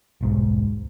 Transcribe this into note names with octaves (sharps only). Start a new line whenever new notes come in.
D#1 B1 G#2